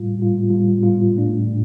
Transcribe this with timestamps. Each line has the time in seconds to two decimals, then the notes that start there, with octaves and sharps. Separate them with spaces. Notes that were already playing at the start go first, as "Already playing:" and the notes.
Already playing: A2 G3 F4
0.18 A2 G3 F4
0.50 A2 G3 F4
0.83 A2 G3 F4
1.15 A2 A3 D4
1.47 A2